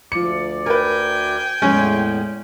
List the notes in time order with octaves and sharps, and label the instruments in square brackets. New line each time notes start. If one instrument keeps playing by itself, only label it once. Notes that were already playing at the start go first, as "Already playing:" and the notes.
[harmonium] D2 D5 [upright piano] F3 C#7
[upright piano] A#4 B4 [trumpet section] G5 G#5
[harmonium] E2 A2 [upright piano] G#3 [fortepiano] C#4